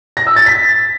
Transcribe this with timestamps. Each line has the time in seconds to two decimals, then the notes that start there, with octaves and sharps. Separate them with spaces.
0.17 A#6
0.27 E6
0.36 A6
0.46 B6